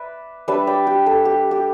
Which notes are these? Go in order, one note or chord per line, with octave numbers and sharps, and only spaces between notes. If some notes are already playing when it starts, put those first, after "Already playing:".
Already playing: B4 D5 E5
G3 D4 B4 E5
D5 G5
G4
A4
G4
G4